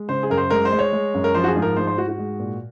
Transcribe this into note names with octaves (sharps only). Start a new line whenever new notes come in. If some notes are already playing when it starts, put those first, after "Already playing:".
Already playing: G#3
C#3 C5
G#4
F#2 A#4
C5
G#3 A#4
C5
G#3
C#5
G#3
F#2
A#4
F3 C5
F#4
G#4
G#2
A#4
G#2 C5
C5
G#2 F#4
F#4
G#3
A#2